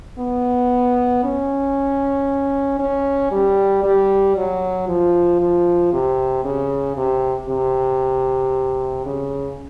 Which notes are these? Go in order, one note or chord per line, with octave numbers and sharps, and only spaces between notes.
B3
C#4
C#4
G3
G3
F#3
F3
F3
C3
C#3
C3
C3
C#3